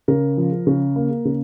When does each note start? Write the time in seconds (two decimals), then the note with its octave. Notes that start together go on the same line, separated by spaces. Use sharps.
0.08 C#3 A#4
0.37 F3
0.67 C#3
0.96 A#3
1.25 C#3